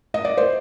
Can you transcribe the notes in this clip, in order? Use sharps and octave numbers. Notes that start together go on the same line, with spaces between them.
D#5
D5
C5